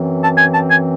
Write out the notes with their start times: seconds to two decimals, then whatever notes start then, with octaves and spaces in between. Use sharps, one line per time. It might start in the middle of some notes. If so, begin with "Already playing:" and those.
Already playing: F#2 E3 C4
0.22 A5
0.38 G#5
0.53 A5
0.70 G#5